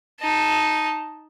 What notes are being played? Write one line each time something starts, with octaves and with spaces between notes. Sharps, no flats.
D#4 A5